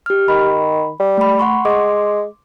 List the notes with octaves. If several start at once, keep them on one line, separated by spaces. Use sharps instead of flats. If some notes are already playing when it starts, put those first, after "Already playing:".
G4 F6
D#3 B5
G3
A3 B5
F#5 C6 C#6
G#3 C6 D6